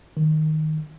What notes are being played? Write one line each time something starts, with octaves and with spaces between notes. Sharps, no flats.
D#3